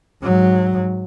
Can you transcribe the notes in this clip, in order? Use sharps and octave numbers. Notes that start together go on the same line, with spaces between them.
G#2 F#3